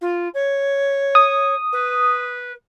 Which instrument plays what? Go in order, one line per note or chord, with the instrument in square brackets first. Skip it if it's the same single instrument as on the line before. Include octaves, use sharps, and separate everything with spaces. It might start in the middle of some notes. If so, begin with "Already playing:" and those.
[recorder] F4
C#5
[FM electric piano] D#6
[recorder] B4